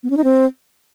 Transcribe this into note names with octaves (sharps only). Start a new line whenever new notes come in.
B3
C#4
D#4
C4